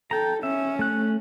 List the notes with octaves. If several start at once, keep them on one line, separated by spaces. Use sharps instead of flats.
A4 G5 A#5
C#4 E5
A3 F#6